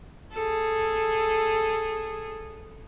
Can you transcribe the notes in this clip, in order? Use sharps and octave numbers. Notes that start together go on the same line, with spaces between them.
G#4 A4